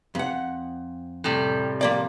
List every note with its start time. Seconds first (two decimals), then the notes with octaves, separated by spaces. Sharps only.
0.15 F2 F#5
1.24 A2 C3 G3
1.81 F3 A#3 D5